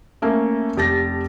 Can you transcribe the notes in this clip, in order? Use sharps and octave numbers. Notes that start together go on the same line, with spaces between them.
A3 A#3 C#4
F1 G4 A5 A6 A#6